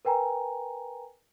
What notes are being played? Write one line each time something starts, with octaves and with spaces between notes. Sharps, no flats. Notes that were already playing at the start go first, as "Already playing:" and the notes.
A#4 B4 G5 G#5 A#5